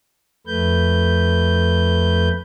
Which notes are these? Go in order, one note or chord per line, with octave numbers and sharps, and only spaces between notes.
F2 A3 B4 G6